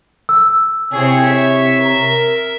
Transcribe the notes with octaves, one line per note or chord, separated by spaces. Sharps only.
E6
C3 C4 E4 G#4 C#5
E5
A#4